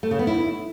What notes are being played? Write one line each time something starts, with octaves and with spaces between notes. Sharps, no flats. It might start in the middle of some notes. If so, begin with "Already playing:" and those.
A3
C#3
B3
E4